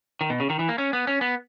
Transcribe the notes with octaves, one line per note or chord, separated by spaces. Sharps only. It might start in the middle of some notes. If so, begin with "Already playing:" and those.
D#3
B2
C#3
D#3
E3
A#3
C#4
B3
C#4
B3